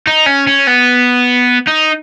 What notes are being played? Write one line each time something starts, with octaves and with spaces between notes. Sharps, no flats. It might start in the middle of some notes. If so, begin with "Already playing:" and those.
D#4
C#4
C#4
B3
D#4